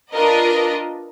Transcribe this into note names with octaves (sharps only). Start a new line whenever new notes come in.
D4 F4 A#4 B4 D#5